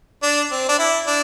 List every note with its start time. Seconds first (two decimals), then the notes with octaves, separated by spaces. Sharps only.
0.23 D4
0.51 C4
0.69 D4
0.79 E4
1.07 D4